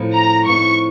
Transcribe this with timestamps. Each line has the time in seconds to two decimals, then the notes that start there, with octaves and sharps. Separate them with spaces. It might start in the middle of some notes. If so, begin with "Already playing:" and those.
Already playing: A2 F3 C4 D#4
0.13 A#5
0.47 A2 F3 C4 D#4 C#6